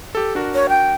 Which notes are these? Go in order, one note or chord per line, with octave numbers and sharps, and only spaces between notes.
G4 A4
D4 F#4 A#4
C#5
G5